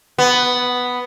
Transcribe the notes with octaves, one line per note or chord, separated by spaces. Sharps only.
B3